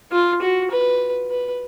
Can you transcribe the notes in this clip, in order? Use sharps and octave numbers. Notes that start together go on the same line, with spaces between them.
F4
F#4
B4
B4